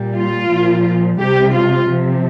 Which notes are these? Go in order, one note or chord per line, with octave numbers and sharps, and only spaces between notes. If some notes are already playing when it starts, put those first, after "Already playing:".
Already playing: A#2 G3
F4
A#2 F3
C3 G3 G4
F4
C3 F3